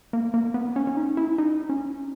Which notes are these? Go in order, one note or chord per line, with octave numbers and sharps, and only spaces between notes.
A#3
A#3
B3
C#4
C#4
D#4
E4
D#4
C#4